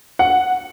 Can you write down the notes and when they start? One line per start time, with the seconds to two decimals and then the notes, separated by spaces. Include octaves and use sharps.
0.19 F#5